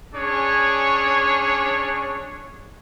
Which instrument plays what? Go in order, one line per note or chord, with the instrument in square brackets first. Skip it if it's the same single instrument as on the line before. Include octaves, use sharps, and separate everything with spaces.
[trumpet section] C#4 D4 G#4 C#5